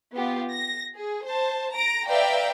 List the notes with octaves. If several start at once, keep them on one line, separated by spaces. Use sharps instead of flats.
B3 F4 G4
A#6
G#4
C5 A5
A#5 A#6 D7
B4 D5 E5 F5 G5 A#5